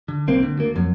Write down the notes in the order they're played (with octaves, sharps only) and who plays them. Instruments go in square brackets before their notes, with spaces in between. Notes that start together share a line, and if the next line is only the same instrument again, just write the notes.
[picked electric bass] D3
B1 A#3 C4
D3
D2 A#3
F2 F#3